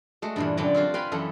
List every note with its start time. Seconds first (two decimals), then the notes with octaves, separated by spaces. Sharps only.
0.22 G#3 A3 F#4
0.36 G2 A#2 E3
0.57 F#2 D3 F#3 D5 G5 A5
0.75 C4 F4 F#4 C5
0.94 B4 F5 G5 G#5 B5
1.12 F#2 E3 A4 F#5 G5